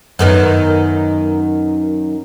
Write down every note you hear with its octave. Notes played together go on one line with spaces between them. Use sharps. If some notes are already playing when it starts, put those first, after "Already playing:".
F#2 D#3 B3